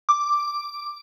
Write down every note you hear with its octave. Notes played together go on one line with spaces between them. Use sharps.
D6